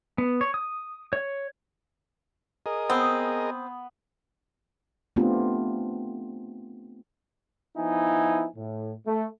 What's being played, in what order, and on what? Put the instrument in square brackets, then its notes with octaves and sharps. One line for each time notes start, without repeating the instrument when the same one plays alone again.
[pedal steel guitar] B3
C#5
D#6
C#5
[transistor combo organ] G#4 A#4 D#5
[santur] B3 [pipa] C4
[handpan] A3 B3 C4 D4 F4 G4
[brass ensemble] F3 B3 D#4 E4 G#5
A2
A3